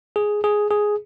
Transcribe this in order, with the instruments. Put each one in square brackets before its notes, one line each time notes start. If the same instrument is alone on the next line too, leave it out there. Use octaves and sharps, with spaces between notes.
[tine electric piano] G#4
G#4
G#4